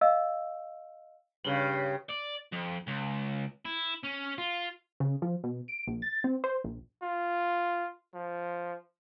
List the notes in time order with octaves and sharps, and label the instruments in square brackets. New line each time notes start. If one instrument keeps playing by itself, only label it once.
[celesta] D#5 F5 E6
[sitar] G2 C#3 [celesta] F#7 G7
[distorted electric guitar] D5
F2
C#2
E4
C#4
F4
[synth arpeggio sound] C#3
F3
B2
D7
A#1
A6
C4
C5
A#1
[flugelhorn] F4
F3